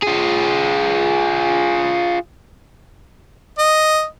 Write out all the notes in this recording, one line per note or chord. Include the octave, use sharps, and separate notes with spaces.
F4 G#4
D#5